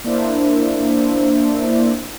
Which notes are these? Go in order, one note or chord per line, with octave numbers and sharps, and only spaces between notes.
A#3 D4 E4 C5 E5